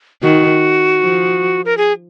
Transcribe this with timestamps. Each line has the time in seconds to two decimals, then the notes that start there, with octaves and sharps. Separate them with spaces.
0.23 D#3 F#4
1.00 F3
1.65 A#4
1.77 G#4